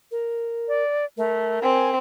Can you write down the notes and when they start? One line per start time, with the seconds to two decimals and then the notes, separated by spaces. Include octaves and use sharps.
0.11 A#4
0.68 D5
1.17 A3 A#4
1.63 C4 G#5